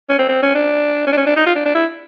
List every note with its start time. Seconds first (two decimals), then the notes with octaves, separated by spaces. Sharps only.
0.09 C#4
0.19 C4
0.29 C4
0.42 C#4
0.55 D4
1.07 C#4
1.12 D4
1.17 C#4
1.27 D4
1.37 D#4
1.46 F4
1.55 D4
1.65 D4
1.75 E4